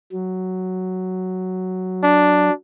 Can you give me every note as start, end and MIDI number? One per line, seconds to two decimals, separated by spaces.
0.12 2.50 54
2.03 2.52 62